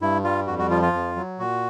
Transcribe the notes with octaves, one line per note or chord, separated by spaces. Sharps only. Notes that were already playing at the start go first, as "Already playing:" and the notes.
G2 E4
G3 F4
F2 F#4
F#4
F3 F4
F4
F2
F#3
A#2 F#4